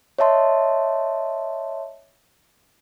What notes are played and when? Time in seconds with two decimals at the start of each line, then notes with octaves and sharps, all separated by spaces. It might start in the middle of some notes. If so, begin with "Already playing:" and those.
0.19 C#5 D#5 E5 A5 C6